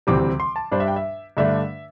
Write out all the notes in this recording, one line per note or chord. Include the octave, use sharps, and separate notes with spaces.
D2 C3 E3 G3 C4 D6
C6
A5
G2 G3 D4 C5
E5
G5
E5
G2 D3 A3 D4 E5